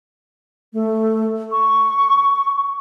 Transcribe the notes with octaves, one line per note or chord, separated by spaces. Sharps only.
A3
C#6